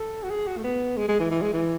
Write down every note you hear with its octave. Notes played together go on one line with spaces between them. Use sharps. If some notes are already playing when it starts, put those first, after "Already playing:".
Already playing: A4
F#4
G#4
F#4
A3
B3
G#3
G#3
E3
E3
G#3
E3